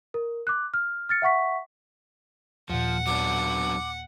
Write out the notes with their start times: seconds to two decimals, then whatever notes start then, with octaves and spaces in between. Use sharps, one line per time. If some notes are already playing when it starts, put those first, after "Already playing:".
0.14 A#4
0.47 D6 F#6
0.74 F6
1.09 F6 A6 C#7
1.22 E5 F#5 C#6 B6
2.70 D#2 A#2 F3 F#5
3.07 F#3 B3 D4 D6